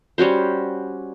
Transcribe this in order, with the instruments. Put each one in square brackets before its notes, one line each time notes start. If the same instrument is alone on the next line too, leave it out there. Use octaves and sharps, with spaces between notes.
[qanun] G3 C#4 F#4 C5